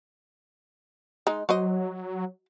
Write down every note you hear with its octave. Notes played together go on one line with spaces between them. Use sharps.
G#3 D#4
F#3 F#4 C5 D#5